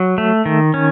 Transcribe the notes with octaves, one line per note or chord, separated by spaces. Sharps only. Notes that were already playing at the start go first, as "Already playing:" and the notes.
Already playing: F#3
A3
D#3
C#4